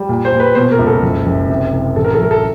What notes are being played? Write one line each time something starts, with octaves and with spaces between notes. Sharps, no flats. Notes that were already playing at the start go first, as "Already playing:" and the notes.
Already playing: G3
A#2
C5
A#2
B4
B2 C5
A#4
C#2
A4
F#1
F#1
C3
C2
A1 A4
A#4
A4
F#3 A#4
A4